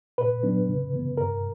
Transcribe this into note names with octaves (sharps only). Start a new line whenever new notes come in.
A#2 B4
F#3 B3 D4
C#3
E3 B3
G2 A#4